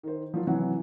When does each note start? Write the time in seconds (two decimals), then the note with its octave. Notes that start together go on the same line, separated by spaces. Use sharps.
0.03 D#3 C5
0.34 F3 F#3 F4
0.47 C3 E3 F#3 F#5